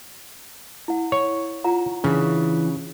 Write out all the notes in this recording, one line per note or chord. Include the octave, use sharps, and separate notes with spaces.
E4 F#5
C#5
F4 F#5 A#5
C#3 E3 C#4 D4